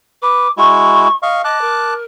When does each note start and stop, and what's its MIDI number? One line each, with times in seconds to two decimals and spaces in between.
0.22 0.48 71
0.22 0.51 86
0.58 1.08 56
0.58 1.08 64
0.58 1.08 66
0.58 1.16 85
1.22 1.42 75
1.22 1.42 77
1.22 1.42 85
1.44 1.61 75
1.44 1.94 81
1.44 1.94 86
1.44 1.94 90
1.61 2.05 70